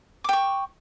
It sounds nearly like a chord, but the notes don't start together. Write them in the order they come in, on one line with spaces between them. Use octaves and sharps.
D6 G5 C#6